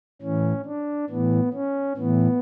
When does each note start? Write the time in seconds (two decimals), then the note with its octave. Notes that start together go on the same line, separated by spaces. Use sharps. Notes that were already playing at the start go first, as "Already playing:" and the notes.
0.22 A2 E3 C#4
0.66 D4
1.09 A2 E3 B3
1.54 C#4
1.97 A2 E3 B3